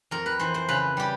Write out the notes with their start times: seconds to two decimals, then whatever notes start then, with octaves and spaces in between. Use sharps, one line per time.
0.11 F2 A#4
0.26 B4
0.40 E3 C5
0.54 C5
0.69 C#3 B4
0.97 G3 G4